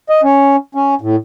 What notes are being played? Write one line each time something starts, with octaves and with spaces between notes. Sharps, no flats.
D#5
C#4
C#4
A2